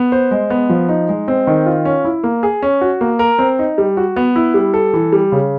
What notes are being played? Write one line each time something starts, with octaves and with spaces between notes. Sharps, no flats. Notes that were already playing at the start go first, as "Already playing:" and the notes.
Already playing: B3
C5
G#3
B3
F3
D#4
G#3
C4
D#3
F4
C#4
E4
A#3
G#4
C#4
F#4
A#3
A#4
C4
D#4
G3
F#4
B3
E4
G3
A4
E3
G3
C#3